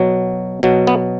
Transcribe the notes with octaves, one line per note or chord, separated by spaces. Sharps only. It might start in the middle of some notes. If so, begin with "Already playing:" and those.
Already playing: B2 F#3
B2 F#3
B3